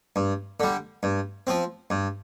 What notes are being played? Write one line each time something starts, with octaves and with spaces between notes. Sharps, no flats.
G2
D3 G3
G2
F3 C4
G2